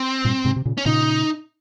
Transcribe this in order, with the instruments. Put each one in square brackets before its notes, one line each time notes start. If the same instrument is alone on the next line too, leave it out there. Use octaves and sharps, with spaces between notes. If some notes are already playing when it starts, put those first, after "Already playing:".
Already playing: [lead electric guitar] C4
[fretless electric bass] G2 A#2
G#2 C3
C3
A#2 C#3
[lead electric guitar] C#4
[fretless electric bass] A#2 C#3 [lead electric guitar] D#4